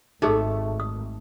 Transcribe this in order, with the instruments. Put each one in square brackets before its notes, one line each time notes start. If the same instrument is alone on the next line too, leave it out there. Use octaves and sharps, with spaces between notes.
[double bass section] G#1 [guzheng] A3 [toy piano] D#4 G#4 A4
[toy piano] D#6